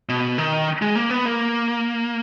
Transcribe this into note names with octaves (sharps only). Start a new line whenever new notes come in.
B2
D#3
G#3
A#3
B3
A#3